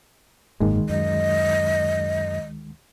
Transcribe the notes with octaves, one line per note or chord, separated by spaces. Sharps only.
F#1 D2 G#2 D#3 G#3 A#3
F#2 D#5